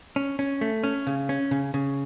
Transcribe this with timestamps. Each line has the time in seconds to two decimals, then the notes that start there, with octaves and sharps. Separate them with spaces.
0.16 C#4
0.39 C#4
0.61 A3
0.84 C#4
1.07 C#3
1.29 C#4
1.51 C#3
1.74 C#3